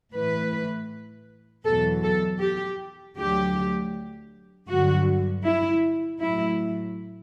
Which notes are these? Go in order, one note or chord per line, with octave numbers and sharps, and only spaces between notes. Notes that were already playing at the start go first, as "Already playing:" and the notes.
A2 E3 B4
E2 B2 F#3 A4
A4
G4
D2 D3 F#3 G4
G2 D3 F#3 F#4
E4
A2 F#3 E4